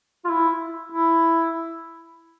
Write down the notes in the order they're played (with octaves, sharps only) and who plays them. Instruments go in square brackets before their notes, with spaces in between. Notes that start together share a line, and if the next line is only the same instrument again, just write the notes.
[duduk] F4
E4
E4